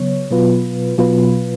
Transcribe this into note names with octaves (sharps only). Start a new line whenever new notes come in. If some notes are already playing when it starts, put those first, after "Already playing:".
Already playing: C#3 F#3 B3 C#5
B2 F#3 B3 F4 B4
B2 F#3 B3 F4 B4